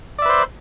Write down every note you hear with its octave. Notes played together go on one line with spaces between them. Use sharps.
B4 C5 D5 E5